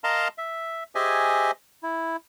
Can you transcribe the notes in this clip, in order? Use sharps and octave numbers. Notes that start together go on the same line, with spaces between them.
A#4 D#5 F5 A5 A#5 C6
E5
G4 G#4 C5 D#5 E5 G#5
E4